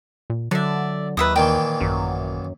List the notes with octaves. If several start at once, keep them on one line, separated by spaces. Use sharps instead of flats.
A#2
D3 F#3 D5 E5
D#2 B4 E5 D#6
A#2 D#3 E3 G5
A1 F#2